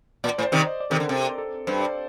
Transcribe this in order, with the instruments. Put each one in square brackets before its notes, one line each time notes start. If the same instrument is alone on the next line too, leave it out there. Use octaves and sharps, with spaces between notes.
[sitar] A#2 [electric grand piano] D5
[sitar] A2 [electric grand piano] C5
[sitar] C3 D#3 [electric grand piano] D5
[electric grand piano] D#5
D5
[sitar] C3 D#3 [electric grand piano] A4
[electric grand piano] A#4
[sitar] D3
[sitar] C3 [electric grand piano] C5
[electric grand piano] A#4
A4
[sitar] G2 [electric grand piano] C5
[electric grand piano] D5